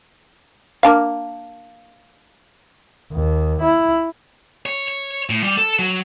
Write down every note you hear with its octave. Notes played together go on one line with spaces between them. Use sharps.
A#3 D4 F5
D#2
E4
C#5
C#5
A2
G3
A4
F#3